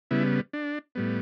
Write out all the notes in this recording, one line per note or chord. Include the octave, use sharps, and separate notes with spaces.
C#3 G3 B3 E4
D4
A2 G3 B3